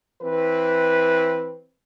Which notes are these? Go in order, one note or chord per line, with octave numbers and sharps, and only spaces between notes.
E3 C4 B4